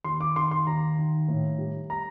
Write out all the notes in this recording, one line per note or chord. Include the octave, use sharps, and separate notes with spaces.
D#2 C6
D6
D#3 C6
C6
D#2 A#5
D#3
A2
G3
A#5